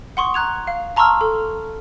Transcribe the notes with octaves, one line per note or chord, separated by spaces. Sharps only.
F#5 C6 C#6 D#6
A#5 F#6 G#6 F7
F5
A5 A#5 C6 C#6 E6 F6
A4